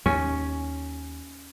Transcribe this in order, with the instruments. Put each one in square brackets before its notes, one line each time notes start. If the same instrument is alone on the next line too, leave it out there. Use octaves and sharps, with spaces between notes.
[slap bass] D#2 [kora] C#4